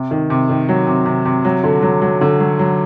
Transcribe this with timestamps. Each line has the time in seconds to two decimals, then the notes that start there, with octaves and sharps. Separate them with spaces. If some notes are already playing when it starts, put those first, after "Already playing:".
Already playing: C3
0.11 D#3
0.30 C3
0.49 D#3
0.69 F#3
0.87 C3
1.06 C3
1.25 C3
1.45 F#3
1.64 D3
1.83 F#3
2.02 F#3
2.21 D3
2.40 F#3
2.59 F#3